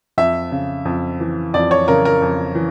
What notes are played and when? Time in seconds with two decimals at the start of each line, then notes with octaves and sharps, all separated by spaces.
0.18 F2 E5
0.51 C#3
0.85 F2
1.20 E3
1.54 F2 D5
1.71 C#5
1.88 C#3 A#4
2.05 A#4
2.22 F2
2.55 E3